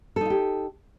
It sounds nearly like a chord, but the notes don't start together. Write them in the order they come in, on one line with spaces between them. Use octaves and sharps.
A4 D#4 F4 G4